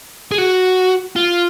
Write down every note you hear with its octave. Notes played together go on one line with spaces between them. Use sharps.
G#4
F#4
F4